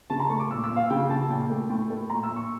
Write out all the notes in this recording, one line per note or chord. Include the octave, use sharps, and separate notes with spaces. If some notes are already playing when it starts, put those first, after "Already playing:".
C#3 A5
A#5
A3 C#6
D6
A#2 E6
E6
A#2
F5
C#3 G5
C#3 A5
A#2 G5
A3
A2 G5
A3
A#2 A#5
E6
A#2
C#6